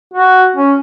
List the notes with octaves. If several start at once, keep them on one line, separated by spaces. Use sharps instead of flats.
F#4
C#4